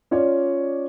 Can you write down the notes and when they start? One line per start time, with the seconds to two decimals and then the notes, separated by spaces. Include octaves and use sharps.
0.11 C#4 F4 C#5 D5